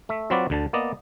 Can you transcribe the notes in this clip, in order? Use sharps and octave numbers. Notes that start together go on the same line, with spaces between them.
A3 E5
F#3 C4 F4 F#4 B4 D5
D2 D3 A5
A#3 B3 D5 D#5